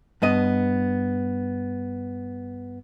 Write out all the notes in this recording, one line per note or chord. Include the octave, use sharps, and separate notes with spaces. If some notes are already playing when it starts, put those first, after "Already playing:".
G2 B3 D#5